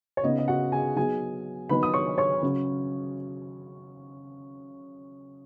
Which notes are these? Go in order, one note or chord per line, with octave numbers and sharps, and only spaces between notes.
C#5
C#3 B3 D#4 D#5
D#5
F#4 F#5
G#4 G#5
F#3 B3 D#4 G#4 G#5
D#3 F#3 B3 D#4 B4 B5
D#6
C#5 C#6
C#5 C#6
C#3 F#3 C#4